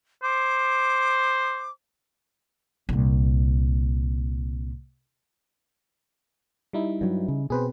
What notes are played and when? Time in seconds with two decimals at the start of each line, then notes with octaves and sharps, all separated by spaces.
0.23 C5 D6
2.89 C2 A#2
6.73 G3 D#4 E4
7.01 G2 F#3
7.28 C#3
7.50 B2 C4 G#4 B4 C5